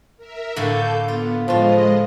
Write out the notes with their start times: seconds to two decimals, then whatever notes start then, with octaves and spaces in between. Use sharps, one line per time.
0.17 A#4 E5
0.56 A2 D3 A#3 A4 G6
1.08 B3 F4
1.48 A2 F3 G#3 F4 D#5